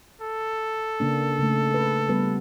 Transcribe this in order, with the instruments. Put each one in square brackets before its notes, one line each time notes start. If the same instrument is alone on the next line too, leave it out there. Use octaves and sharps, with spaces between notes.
[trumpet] A4
[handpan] C#3 A#3 D4
C#3 A3
B4
G3 B3 B4